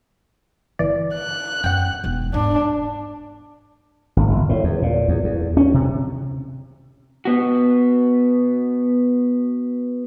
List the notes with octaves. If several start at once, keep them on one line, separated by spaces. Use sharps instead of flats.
G1 E3 D5
F#6
F#2 F#5 G5
E1 D#4
G#2 D4
G#1
G1
A2
E2
A#2
E2
E2
C#4
C3
B3 F#4